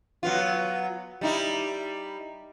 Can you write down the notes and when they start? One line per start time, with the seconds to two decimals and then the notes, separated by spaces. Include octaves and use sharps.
0.23 F#3 B3 F4
1.21 G3 D#4 E4